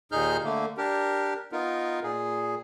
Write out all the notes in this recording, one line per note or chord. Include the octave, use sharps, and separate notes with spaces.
D#2 A#2 D#4 G#4 F6 G6
D3 A3 A#3
D4 G4 A#4
B3 D#4 F4 A#4
A#2 G#4